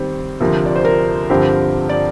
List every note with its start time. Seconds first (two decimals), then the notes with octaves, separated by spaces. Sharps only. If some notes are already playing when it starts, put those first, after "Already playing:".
Already playing: D#3 G3 C4
0.40 D2 C3 F3 A#4
0.66 D5
0.75 C5
0.85 A#4
1.30 G2 D3 F3 C4 G4
1.89 D5